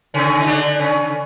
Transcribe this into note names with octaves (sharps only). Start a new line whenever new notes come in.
C#3 C#4
D#4
D3 D4
C#3 C#4